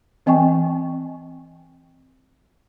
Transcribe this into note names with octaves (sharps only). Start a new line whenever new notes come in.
E3 C4 D#5 G5 G#5 C#6